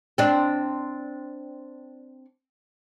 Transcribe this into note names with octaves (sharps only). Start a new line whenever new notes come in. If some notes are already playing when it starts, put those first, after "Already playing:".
C4 D4